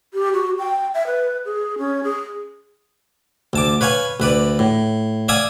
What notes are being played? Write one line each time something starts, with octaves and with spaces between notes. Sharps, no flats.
G4
F#4
G5
E5
B4
G#4
C#4
G#4
D2 A5 D6
B4 C#5 F5 G#5
D2 B4 D5
A2
D5 E5 F5 G#5 D#6